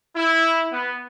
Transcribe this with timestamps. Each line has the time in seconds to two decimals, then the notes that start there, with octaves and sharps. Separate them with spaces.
0.16 E4
0.72 B3